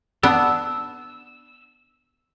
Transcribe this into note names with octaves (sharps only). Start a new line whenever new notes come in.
B3 D4 E6